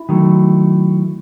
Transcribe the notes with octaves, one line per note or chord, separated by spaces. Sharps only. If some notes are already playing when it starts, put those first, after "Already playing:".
Already playing: E4
D#3 F#3 A3